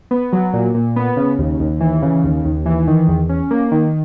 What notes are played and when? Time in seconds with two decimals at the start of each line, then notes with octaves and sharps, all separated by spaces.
0.11 B3
0.33 F#3
0.53 A#2
0.74 A#2
0.96 B3
1.17 C#3
1.38 D#2
1.60 D#2
1.80 E3
2.02 C#3
2.24 D#2
2.45 D#2
2.66 E3
2.87 D#3
3.08 E2
3.29 C#4
3.51 A#3
3.71 D#3